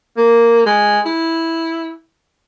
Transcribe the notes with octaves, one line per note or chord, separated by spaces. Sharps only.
A#3
G#3
E4